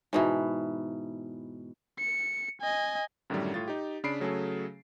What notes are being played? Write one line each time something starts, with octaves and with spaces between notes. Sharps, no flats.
G#2 B2 E3
C#7
D#5 G#5
F#2 A2 D3 D#3 F#3 G3
A2 F4 A6
D#4 G4
C#3 D4 B5 C7 D7
C#3 F#3 A3 G#4 A4